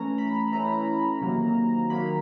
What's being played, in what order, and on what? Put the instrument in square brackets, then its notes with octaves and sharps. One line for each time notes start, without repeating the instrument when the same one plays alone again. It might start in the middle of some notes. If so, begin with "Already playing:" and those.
Already playing: [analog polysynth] E3 A3 C#4 A#5
B5
E3 A3 C#4 A#5
C3 D#3 F#3 A#3
C3 D#3 F#3 A#3 B5